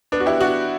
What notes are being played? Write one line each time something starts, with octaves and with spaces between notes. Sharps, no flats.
B3 D4
F#4
E4 G4
D4 F#4